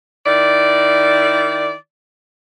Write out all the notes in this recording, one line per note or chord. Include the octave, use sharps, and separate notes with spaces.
D#3 E4 D5